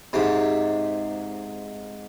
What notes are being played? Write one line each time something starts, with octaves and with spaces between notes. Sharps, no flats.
G#2 C3